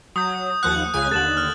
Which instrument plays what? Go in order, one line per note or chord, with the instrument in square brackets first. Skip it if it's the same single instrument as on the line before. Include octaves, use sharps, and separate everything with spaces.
[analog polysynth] F#3 [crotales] D#6 G6
[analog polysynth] D#2 F3 F#5 [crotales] F#6
[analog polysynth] C#2 C#3 G#5
[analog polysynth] D#2 D3 [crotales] A6 E7 F#7
[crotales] F6